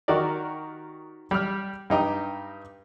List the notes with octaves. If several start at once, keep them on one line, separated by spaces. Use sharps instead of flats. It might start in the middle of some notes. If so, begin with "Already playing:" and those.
D#3 F#4 G4 A#4 D5
G3 F6
G2 D#4 G4